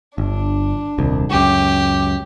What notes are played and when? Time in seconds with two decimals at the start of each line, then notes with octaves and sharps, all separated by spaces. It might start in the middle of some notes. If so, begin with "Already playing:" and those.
0.18 G1 D4
0.98 D#1 C2
1.31 C#2 F#2 G4